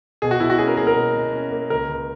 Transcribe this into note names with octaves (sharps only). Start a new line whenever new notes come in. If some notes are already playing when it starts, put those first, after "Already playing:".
B2 G#4
F#4
B2 E4
F#4
C#4 G#4
A#4
A#3 G#4
A#4
B2
B2
C#4
A#3
C#2 A#4
C#2